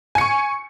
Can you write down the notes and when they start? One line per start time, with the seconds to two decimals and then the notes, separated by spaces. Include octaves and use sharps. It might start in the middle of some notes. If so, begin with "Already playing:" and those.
0.15 G#5
0.18 C#7
0.21 C#6